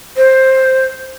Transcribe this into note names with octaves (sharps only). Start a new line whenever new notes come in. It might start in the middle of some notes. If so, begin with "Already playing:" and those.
C5